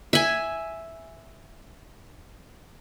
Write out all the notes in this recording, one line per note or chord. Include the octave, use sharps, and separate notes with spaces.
E5 G#5